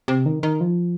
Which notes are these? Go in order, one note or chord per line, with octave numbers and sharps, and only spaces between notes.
C3
D#3
D#3
F3